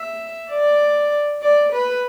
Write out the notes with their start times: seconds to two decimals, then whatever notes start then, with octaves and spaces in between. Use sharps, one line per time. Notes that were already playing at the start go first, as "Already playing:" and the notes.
Already playing: E5
0.51 D5
1.42 D5
1.73 B4